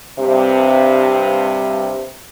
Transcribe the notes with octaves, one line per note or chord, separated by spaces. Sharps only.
G2 C3